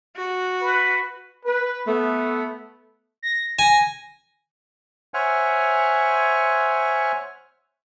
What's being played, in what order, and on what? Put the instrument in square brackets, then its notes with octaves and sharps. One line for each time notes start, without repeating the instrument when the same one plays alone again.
[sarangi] F#4
[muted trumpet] B4
[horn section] B4
A3 B3
[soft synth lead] A#6
[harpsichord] G#5 [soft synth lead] A#6
[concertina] C5 C#5 E5 F#5 G#5 F6